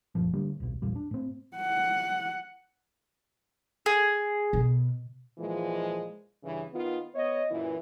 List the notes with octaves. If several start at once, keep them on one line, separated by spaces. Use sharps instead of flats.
F#1 A#2 F3
A2 D3 G3 A#3
D#1 B1
A1 E2 A#2 G3
D4
A2 C4
F#5
G#4
B2
A#2 E3 F3 G#3
G2 C#3 E3
D#3 B3 F4
B3 C#5 D#5
F#2 A#2 E3